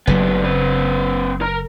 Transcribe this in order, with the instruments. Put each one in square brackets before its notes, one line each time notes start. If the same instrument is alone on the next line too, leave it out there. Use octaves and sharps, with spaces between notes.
[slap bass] F#1 C#3 F#3 [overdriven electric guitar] D2 B3
[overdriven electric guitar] C4 B4
A#4 A#5